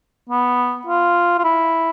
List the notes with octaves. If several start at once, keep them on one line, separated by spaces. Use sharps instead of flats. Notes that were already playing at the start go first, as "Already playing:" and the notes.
B3
F4
F4
E4